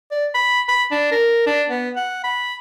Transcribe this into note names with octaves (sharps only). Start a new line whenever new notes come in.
D5
B5
B5
D4
A#4
D4
B3
F#5
B5